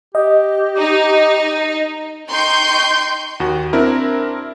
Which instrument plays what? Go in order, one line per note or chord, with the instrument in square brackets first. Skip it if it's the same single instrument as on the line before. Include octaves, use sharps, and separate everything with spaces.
[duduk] G4 [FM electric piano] D#5
[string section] D#4
[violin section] D#4 G5 C6 C#6 G6
[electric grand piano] D#2 F#4
C4 D4 E4 A#4